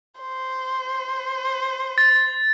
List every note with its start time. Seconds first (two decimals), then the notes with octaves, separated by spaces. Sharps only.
0.21 C5
1.98 A6